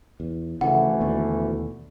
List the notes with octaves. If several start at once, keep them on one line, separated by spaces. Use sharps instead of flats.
E2
D2 C#3 E3 F3 A3 F#5
D#2 B2 D3